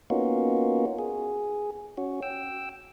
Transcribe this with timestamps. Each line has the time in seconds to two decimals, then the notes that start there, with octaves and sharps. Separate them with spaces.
0.10 A#3 B3 C#4 D#4 F4 F#4
0.99 G#4
1.97 C#4 F#4
2.23 G5 E6